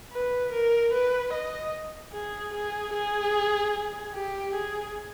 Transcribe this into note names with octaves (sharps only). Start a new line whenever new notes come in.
B4
A#4
B4
D#5
G#4
G#4
G#4
G4
G#4